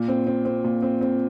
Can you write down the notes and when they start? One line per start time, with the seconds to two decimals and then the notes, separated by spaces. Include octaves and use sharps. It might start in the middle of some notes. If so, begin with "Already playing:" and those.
Already playing: A#2
0.08 C4
0.27 C4
0.45 C4
0.64 A#2
0.82 C4
1.01 C4